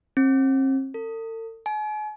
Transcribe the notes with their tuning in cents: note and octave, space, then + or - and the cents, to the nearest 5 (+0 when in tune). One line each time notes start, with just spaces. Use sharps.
C4 +40
A4 +45
G#5 +40